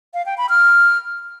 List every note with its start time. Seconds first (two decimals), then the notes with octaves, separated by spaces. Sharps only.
0.14 F5
0.26 G5
0.38 B5
0.49 F6